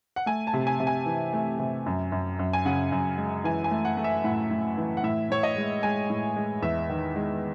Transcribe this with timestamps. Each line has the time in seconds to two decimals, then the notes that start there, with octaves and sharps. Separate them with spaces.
0.16 F#5
0.26 A3 G#5
0.47 A5
0.53 C3
0.67 G#5
0.80 C3
0.87 G#5
1.06 E3
1.33 A3
1.59 C3
1.86 F#2
2.12 F#2
2.39 F#2
2.53 G#5
2.65 C#3 F#5
2.92 F#2
3.18 G#3
3.44 E3 G#5
3.64 G#5
3.71 A3
3.85 F#5
3.97 A3
4.04 E5
4.24 A2 F#5
4.51 A2
4.77 E3
4.97 F#5
5.03 A2 E5
5.30 A2 C#5
5.43 D#5
5.56 G#3
5.83 G#3 G#5
6.10 A2
6.37 G#3
6.62 E2 E5
6.89 D#3
7.16 G#3